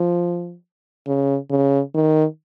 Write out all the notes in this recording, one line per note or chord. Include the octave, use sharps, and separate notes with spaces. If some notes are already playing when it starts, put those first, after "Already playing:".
Already playing: F3
C#3
C#3
D#3